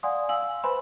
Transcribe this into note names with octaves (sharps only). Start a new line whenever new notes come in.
D5 F5 F#5 G#5 C6 D#6
F5 G#5 E6 F#7
B4 C5 E5 G#5 B5 C6